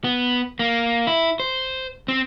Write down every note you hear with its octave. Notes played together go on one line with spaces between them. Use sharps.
B3
A#3
E4
C5
C4